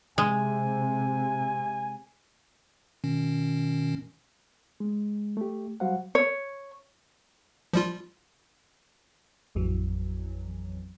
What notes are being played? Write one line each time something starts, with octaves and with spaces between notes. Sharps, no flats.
C3 G#3 G#5
B2 D#3 C#4
G#3
A3 G4
F#3 G3 F#4 C5 F5 F#5
C#5
F3 G3 F4
A1 F2 E3 F#3